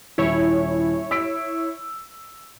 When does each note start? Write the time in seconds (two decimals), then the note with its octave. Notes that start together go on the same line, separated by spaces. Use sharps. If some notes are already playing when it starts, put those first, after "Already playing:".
0.18 D#1 E4 C#5
1.11 E6 B6 D7